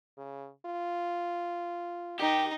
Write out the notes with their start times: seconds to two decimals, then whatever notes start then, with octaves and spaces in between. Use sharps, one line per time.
0.18 C#3
0.66 F4
2.19 D#3 D#4 G4